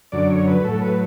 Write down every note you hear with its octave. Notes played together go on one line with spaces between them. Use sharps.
F#2 D3 F#3 D5
C#5
B4
A2 F#3 A4
B4